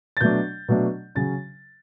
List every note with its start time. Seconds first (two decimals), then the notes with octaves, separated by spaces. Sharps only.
0.17 A6
0.21 B2 F#3 A3 D4 G6
0.69 B2 F#3 A3 D4
1.15 C#3 F#3 C#4 A6